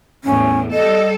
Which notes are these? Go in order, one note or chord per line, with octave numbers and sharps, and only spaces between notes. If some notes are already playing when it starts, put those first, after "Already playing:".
E2 A2 C#4
G3 A4 D#5